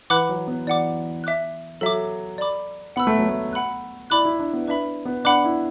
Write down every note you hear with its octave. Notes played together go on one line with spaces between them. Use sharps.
E3 B4 F#5 B5 D6 F#6
F#3
B3
E3 D5 F#5 D6
E5 D6 F#6
F#3 A4 E5 D6
D5 B5 D6
B3 F#5 B5 E6
A3
F#3
A3
F#5 B5 F#6
E4 D5 B5 D6 F#6
E4
D4
B3
D4 B4 E5 B5
B3
D4 F#5 B5 D6 F#6
E4